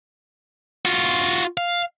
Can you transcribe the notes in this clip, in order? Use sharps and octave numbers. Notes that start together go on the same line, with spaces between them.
F4 F#4
F5